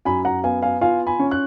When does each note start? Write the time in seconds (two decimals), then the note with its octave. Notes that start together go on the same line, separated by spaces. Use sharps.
0.05 F#2 G#5 B5
0.25 F#5 A#5
0.43 B3 F5 G#5
0.62 F5 G#5
0.81 F4 F5 G#5
1.07 G#5 B5
1.20 C#4
1.31 F#6